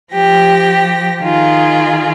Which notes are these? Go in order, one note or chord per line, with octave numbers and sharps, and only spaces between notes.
F3 G4 A#6
D#3 F4 G#4